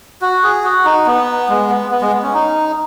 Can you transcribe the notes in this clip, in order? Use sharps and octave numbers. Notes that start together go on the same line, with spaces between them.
F#4
G#4
F#4
D#4
B3
G#3
B3
B3
G#3
B3
C#4
D#4